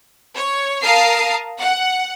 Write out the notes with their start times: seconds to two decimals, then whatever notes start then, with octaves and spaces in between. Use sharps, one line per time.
0.35 C#5
0.83 A#4 F5 A5 A#5 D#6 C7
1.60 F#5